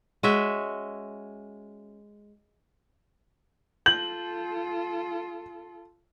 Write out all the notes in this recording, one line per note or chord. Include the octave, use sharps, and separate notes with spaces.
G#3 C#4 F#4 E5
F4 A4 G6 F#7